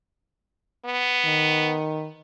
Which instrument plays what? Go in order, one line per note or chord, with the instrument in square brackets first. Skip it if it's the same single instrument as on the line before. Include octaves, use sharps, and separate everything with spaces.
[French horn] B3
[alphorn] D#3